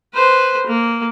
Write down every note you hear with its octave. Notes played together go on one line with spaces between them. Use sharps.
B4 C5
A#3